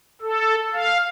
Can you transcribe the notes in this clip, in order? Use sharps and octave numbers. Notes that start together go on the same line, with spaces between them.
A4
F5